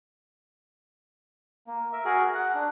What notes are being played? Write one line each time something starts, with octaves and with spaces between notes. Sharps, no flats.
A#3
A#4 E5
F#4 G#4 A#4
F#5
D4